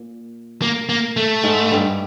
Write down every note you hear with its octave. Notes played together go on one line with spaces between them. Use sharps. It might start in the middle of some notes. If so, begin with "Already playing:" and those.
Already playing: A#2
A#3
A#3
A3
G#2 G#3
G2 G3